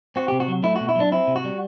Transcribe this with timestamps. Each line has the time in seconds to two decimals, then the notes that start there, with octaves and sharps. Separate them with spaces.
0.16 C4 F#4
0.28 C3 G4
0.40 F#4
0.48 F#3
0.64 A3 E4
0.76 B2 F#4
0.89 E4
0.96 F#3 D4
1.12 C4 E4
1.27 C3
1.36 F#4
1.44 G3